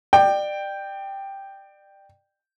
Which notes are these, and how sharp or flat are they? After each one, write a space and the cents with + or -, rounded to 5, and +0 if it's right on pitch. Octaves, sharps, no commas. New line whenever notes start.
D5 +30 G5 +0